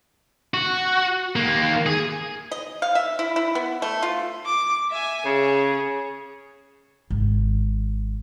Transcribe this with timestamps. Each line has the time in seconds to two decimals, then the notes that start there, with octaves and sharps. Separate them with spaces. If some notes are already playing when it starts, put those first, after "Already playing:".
0.54 F#4
1.36 D#2 A#3
1.86 G#4
2.51 D#5
2.82 F5
2.95 E5
3.19 E4
3.36 E4
3.55 B3
3.82 A3
4.03 F4
4.46 D6
4.91 E5 G#5
5.26 C#3 G#4
7.10 G#1